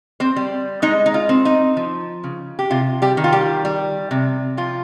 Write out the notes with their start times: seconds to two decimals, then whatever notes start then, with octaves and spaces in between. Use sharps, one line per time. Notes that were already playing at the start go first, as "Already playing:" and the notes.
0.20 C4 C5
0.36 G3
0.82 G#3 D#4
1.06 D#4
1.14 F4
1.29 C4
1.45 D#4
1.77 F3
2.24 C#3
2.59 G4
2.70 C3 F4
3.02 G3 G4
3.17 D#3
3.24 F4
3.32 G3 G4
3.65 G3
4.11 C3
4.57 F3 F4